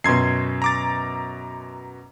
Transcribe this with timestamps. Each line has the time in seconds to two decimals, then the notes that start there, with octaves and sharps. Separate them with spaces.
0.04 F#2 B2 C6 G#6 C7
0.62 A#5 D6 A6